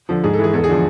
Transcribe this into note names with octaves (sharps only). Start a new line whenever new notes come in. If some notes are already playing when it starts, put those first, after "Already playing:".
D3 F3
G#2 G#4
A4
E3 G#4
E2 A4
G#4
D3 F3